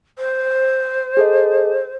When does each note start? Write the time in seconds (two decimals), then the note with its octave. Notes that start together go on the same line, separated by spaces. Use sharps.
0.18 C5
1.17 G#4 A4 D#5